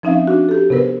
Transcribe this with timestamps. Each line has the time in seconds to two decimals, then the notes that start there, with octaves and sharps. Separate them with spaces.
0.03 F3 C4 C#4 D#4 E5 F5
0.28 D4 F#4
0.49 G4 A4
0.70 C3 B3 A#4 B4